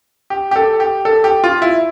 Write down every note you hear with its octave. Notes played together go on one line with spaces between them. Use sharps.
G4
G4
A4
G4
A4
G4
F4
E4